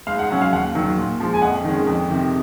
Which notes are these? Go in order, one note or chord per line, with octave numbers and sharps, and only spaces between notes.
G#2 F5
F#5
F#3 C#4 F#5
F5
D#2 F#5
D#3 F#3
A#2
F3 G#3
G#5
F2 F#5
D#3 G#3 C#4
F2
C3 D#3